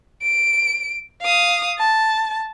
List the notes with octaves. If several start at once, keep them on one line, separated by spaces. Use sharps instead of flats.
D7
F5 D#6
A5